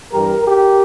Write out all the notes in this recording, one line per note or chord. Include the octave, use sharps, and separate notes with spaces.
G2 E3 G3 G4 A#4
G4 A#4